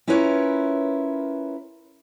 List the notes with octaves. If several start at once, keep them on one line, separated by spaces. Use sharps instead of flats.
C#4 E4 F4 A#4 B4 C#5